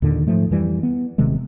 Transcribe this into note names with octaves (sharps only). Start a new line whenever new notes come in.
D#2 A#2 D3 D#3
G#2 F3 A3
F2 E3 G3
B3
D#1 C3 D#3 G#3